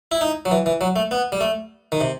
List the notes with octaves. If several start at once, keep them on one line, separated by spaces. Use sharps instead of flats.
E4
D#4
F#3
E3
E3
F#3
A3
B3
G3
A3
D#3
C3